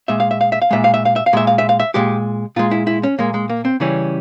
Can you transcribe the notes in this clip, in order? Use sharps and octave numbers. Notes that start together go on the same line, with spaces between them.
A#2 G#3 E5
F5
E5
F5
E5
F5
A#2 G#3 E5
F5
E5
F5
E5
F5
A#2 G#3 E5
F5
E5
F5
E5
A#2 G#3 G4
A#2 G#3 F4
E4
E4
C#4
A#2 G#3 A#3
G#3
A#3
C4
C#3 E3 G3 C#4